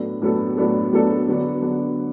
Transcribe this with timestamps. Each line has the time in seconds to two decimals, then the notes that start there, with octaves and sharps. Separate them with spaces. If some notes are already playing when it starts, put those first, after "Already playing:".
Already playing: A2 F#3 B3 D4 A4
0.22 A2 F#3 B3 D4 A4
0.57 A2 F#3 B3 D4 A4
0.92 A2 F#3 B3 D4 A4
1.27 D3 F#3 B3 D4
1.62 D3 F#3 B3 D4